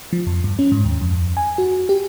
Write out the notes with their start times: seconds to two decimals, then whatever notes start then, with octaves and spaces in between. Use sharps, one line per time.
0.13 F3
0.27 F2
0.44 G2
0.59 C#4
0.72 G#2
0.85 D#2
1.01 F2
1.37 G#5
1.58 F#4
1.89 G4